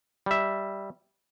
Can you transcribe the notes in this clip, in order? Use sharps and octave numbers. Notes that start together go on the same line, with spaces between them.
G3 E5